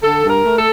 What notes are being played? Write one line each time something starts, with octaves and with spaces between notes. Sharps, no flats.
D3 A4
G2
A#4
A3
A4